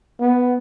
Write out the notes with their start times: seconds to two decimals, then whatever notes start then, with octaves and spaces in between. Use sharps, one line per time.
0.20 B3